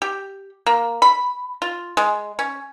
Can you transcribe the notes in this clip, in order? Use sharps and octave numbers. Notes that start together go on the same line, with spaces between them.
G4
A#3
B5
F4
G#3
C#4